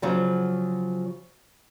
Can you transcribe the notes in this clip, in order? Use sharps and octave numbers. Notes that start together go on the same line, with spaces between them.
C#3 F3 F#3